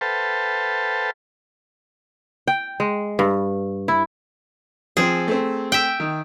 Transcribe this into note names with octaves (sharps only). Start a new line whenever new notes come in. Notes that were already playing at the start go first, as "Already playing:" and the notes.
A4 B4 C5 F5 G5 A5
G5
G#3
G2
E4
F3 C4 G#4
A3 C4
E5 G5
D#3